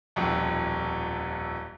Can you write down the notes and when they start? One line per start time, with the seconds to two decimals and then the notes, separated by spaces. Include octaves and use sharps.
0.16 D#1 B1 F2